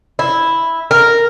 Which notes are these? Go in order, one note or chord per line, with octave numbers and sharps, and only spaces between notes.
E4
A#4